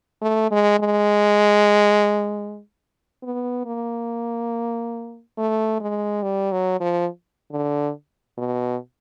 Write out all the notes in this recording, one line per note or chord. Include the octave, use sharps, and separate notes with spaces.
A3
G#3
G#3
B3
A#3
A3
G#3
G3
F#3
F3
D3
B2